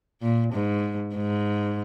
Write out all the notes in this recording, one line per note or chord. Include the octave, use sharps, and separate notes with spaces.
A#2
G#2
G#2